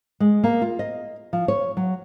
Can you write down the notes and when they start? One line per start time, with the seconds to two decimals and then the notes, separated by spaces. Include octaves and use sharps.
0.20 G#3
0.44 A#3
0.61 F4
0.79 D#5
1.33 F3
1.48 C#5
1.77 F#3